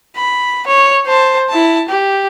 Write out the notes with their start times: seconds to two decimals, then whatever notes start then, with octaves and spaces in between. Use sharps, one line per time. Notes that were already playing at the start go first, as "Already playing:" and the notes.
0.16 B5
0.67 C#5
1.06 C5 A5
1.49 E4 A5
1.89 G4